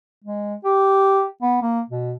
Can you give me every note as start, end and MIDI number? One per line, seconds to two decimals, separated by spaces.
0.24 0.55 56
0.64 1.25 67
1.42 1.58 59
1.62 1.81 58
1.90 2.14 47